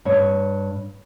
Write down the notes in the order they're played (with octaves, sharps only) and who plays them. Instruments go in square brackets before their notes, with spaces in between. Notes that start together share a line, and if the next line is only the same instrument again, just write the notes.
[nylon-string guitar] G2 C#5